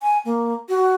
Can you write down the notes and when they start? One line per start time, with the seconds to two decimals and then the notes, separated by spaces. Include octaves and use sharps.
0.02 G#5
0.25 A#3
0.69 F#4